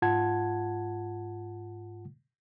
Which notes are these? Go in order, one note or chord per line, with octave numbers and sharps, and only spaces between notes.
G#2 F4 F#5 A5 G#6